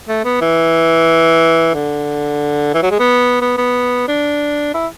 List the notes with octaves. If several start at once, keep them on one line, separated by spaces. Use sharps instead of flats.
A3
B3
E3
D3
E3
F#3
G#3
B3
B3
B3
D4
E4